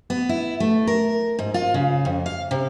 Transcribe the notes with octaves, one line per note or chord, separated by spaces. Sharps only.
B3
E4
A3
A#4
G#2
F4
C#3
F2
F5
C3